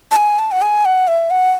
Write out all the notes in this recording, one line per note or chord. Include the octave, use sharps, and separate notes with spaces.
A5
G#5
A5
F#5
G#5
F#5
E5
F#5